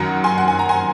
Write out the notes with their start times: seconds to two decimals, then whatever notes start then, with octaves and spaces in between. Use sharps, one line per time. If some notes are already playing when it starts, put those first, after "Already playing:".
Already playing: F#2 D#3 F#3 F#5 A#5
0.24 G#5 C6
0.38 F#5
0.48 G#5
0.59 A#5
0.69 G#5 C6